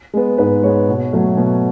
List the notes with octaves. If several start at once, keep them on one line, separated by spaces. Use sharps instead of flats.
G#3 B3
G#2 B4
G#3 B3 C#5
B2
F#3 A3
B2